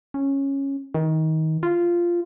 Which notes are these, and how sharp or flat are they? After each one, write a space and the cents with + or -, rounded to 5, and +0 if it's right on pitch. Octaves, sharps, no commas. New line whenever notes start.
C#4 -10
D#3 +25
F4 -10